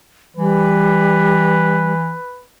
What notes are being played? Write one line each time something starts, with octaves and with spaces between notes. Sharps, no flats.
E3 G3 B4